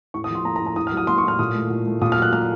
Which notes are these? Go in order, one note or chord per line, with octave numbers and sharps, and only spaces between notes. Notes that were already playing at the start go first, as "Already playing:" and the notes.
A2 C#6
D#6
F3
C6
A#3 A#5
A#5
A2
A#5
A2 D#6
F6
F#3
D#6
A#3 C6
C#6
A2 F6
A#2 D#6
A3
A#2
A3
A#2 D#6
F6
F#3
F#6
A#3 F6